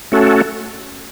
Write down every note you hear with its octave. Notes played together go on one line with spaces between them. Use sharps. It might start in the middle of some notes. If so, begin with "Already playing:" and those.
A3 C#4 F#4 A4